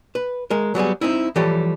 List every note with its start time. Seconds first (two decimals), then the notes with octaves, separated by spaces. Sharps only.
0.15 B4
0.50 G#3 A#4
0.75 F#3 G3 B3 G#4
1.01 C4 D#4 E4
1.36 E3 F3 G3 G4 A4 C#5